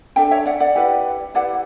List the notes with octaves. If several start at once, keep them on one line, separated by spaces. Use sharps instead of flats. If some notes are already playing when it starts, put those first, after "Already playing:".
D4 A4 E5 G5
C#5 E5
D5 F#5
D5 F#5
E4 G4 B4
E4 G4 B4 D5 F#5